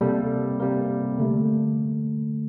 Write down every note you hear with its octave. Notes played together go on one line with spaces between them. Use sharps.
C3 G3 A#3 A4
C3 G3 A#3 A#4
D3 A3